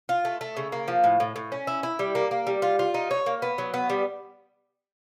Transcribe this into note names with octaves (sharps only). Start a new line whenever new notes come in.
F4
A3
A3
C#3
A#3
F3
A2
A2
A2
C#4
E4
E4
G3
A#3
A#3
G3
F4
F4
D#4
C#5
A#3
B3
F#3
B3
G3